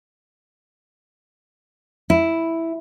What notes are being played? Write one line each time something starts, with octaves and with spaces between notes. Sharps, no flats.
E4